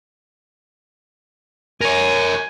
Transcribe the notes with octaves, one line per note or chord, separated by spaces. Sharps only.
A#4 C#5 G#5